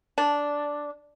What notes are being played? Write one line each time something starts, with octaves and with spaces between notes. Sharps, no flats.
D4